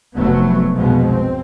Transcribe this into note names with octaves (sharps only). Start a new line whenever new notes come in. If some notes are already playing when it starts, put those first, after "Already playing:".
F1 F#3 A3 B3
F1 B1 B2 F3 G#3 B3
C4